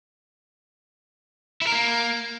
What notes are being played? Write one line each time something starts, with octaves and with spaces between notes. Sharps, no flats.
E4
A#4
A#3